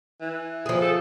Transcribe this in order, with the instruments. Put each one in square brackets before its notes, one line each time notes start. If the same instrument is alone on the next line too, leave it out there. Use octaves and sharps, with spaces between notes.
[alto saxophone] E3
[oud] F3 G#4
[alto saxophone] A4